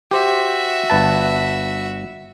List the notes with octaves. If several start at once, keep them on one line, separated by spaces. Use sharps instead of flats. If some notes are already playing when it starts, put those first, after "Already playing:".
F#4 G4 C5 E5
G1 B4 A5